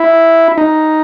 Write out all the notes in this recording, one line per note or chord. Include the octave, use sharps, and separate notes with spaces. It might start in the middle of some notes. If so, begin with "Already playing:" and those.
Already playing: E4
D#4